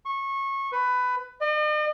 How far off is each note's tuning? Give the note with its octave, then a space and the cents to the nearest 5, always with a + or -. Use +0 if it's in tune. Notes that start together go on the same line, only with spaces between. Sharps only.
C#6 -20
B4 +15
D#5 -45